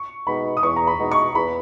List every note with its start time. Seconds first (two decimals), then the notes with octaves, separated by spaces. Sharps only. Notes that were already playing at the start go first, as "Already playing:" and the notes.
Already playing: C#6
0.27 B2 G#3 B3 D#4 B5
0.57 D#6
0.63 E2 C#6
0.76 A#5
0.87 B5
0.99 B2 G#3 B3 D#4
1.11 C#6
1.35 E2 B5